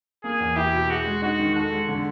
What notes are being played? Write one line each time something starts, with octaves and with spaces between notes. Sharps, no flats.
A#3 G#4
E2
E4 G4
B2
F#4 G#4
G#3
D#4 F#4
D#3
F#4 A4
G#3
D3